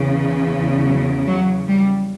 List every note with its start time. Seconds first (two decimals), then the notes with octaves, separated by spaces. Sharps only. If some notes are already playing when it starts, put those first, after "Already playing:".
Already playing: E2 C#3
0.84 F#3
1.26 F#3
1.68 G3